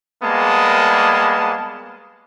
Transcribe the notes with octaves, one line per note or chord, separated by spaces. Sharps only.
G3 G#3 A#3 B3 A5